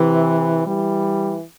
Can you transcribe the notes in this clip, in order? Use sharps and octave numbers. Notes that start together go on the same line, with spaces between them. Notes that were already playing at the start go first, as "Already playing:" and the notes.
Already playing: C3 E3
E3 G3